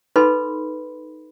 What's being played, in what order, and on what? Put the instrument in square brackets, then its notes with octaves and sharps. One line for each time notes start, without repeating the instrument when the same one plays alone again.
[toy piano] D#4 A4 B4 B5 C6